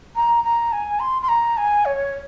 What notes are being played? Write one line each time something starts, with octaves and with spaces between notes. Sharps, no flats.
A#5
A#5
G#5
C6
C6
A#5
G#5
C#5